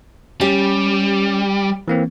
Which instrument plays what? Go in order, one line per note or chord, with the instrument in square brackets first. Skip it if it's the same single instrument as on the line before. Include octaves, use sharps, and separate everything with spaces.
[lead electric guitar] G3 [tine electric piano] C#4 [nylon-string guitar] G4
[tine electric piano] E3 A#3 C4